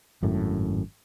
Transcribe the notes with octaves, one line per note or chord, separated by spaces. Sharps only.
G#1 F#2 A2